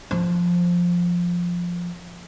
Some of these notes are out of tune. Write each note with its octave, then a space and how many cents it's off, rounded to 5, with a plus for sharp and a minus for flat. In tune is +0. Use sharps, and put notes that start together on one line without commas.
F3 +5